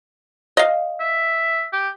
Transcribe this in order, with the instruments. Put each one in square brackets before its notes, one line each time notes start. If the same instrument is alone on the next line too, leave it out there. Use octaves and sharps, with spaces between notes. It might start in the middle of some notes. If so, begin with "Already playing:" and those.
[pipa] D#5 F5
[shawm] E5
G4